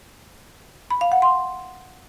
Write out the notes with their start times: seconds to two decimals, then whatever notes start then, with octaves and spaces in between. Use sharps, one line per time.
0.91 B5
1.01 F5
1.12 F#5
1.22 C6